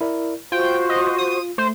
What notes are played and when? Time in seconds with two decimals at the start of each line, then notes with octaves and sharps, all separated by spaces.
0.01 E4 A#4 D5
0.52 F4 F#4 C5 G5
0.89 D#5
1.18 D#6
1.58 A3 C5